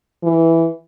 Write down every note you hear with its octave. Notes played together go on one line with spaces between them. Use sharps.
E3